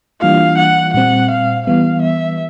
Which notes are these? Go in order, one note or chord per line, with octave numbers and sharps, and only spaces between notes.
E3 G3 A#3 D4 F4 F5
F#5
A#2 G3 C4 F#5
F5
E3 G3 B3 F5
E5